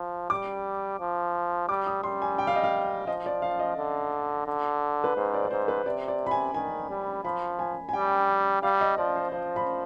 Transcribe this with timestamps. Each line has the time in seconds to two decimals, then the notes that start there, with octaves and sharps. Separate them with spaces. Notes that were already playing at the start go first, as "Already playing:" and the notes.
Already playing: F3
0.30 G3 D6
1.00 F3
1.69 G3 D6
1.87 D#6
2.03 G3 C6
2.22 G#5
2.38 G5
2.47 F5
2.56 D#5
2.64 F5
3.07 F3 D#5
3.26 D5
3.42 F5
3.59 D#5
3.77 D3
4.47 D3
5.04 B4
5.16 G#2 C5
5.34 D5
5.45 D5
5.51 G#2 C5
5.68 B4
5.85 C3 D5
6.08 D5
6.26 B5
6.31 G#5
6.54 D#3 G#5
6.90 G3
7.24 F3 B5
7.59 G#5
7.89 G#5
7.93 G3 G5
8.63 G3 F5
8.81 D#5
8.97 F3 D5
9.16 C5
9.32 F3 C5
9.56 B5